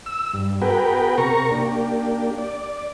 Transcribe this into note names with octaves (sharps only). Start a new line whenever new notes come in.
E6
G2
B3 F#4 G#4 A#4 B4 G5
C3 A#4 A#5 C#6
A#3 D4 G4
D5